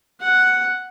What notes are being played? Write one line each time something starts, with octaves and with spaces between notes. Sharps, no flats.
F#5